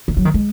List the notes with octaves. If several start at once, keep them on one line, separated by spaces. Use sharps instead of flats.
D#3
F#3
D#3
G#3